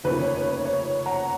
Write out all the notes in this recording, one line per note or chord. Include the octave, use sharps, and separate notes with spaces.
F1 D#2 C#3 F3 B4
C#5
C#5
B4
C#5
F#5 A#5